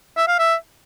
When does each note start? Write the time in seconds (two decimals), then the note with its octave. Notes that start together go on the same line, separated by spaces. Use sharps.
0.17 E5
0.28 F5
0.39 E5